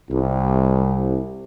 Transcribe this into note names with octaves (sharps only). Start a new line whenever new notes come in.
C2